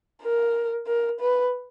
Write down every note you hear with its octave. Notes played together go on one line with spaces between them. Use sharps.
A#4
A#4
B4